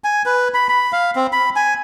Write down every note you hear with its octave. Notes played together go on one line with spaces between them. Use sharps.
G#5
B4
B5
B5
F5
C4
B5
G#5